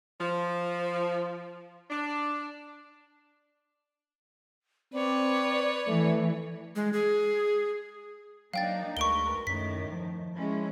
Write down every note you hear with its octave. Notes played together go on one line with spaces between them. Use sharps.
F3
D4
C4 B4 C#5 D5
E3 A3
G#3
G#4
F#3 A#3 D4 D#4 F5 G5 A6
D2 G#3 A#4 B4 C#6 D7 G7
F#2 A2 D#3 B6
F3
G#3 C#4 E4